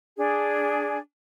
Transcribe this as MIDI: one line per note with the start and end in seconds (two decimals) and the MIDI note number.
0.17 0.98 62
0.17 0.98 68